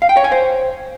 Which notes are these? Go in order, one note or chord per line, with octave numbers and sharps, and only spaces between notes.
F5
G5
C#5
G#5
C5